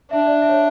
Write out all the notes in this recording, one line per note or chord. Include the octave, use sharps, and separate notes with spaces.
D4 E5
D5
E5
C#5